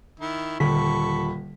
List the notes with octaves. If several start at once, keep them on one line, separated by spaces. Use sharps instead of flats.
D#3 E4
D#1 D3 A4 B5 C#6 B6